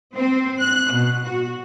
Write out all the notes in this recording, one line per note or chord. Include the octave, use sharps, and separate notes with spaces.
C4
F#6
B2
F#4